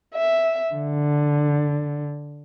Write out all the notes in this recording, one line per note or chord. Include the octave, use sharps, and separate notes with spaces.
E5
D3